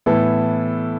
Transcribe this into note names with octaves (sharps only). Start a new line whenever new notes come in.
A2 E3 B3 E4 A4